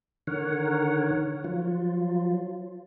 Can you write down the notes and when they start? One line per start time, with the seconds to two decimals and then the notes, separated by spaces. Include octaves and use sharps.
0.27 D3 D#3 A#4 C#5 F#5
1.44 F3 F#3 F4